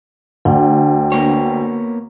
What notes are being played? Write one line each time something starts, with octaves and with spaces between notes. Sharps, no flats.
D2 D4 G5
A#3 B3 C#5